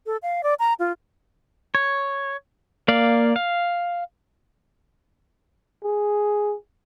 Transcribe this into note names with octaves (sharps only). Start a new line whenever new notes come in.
A4
F5
D5
A#5
F4
C#5
A#3 D5 F5
F5
G#4